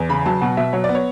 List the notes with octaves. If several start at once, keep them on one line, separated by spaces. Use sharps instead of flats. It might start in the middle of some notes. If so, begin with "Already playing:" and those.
Already playing: E2
C#3 B5
F#3 A5
B2 F#5
B2 E5
F#3 C#5
B3 D5
C#5